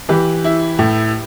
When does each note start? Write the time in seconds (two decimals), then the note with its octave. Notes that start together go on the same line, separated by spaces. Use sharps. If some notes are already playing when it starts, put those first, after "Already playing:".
0.09 E3 G4 B4
0.44 E4
0.79 A2